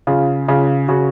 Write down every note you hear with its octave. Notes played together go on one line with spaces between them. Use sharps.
C#3 F4
C#3 F4
C#3 F#4